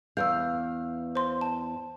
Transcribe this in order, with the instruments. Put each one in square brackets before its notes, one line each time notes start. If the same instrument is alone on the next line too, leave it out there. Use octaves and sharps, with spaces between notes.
[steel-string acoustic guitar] E2 F5 [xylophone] E6 G6
[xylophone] C5 C6
A5